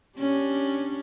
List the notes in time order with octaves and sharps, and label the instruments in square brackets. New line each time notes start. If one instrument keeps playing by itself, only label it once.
[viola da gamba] C#4 D4 G4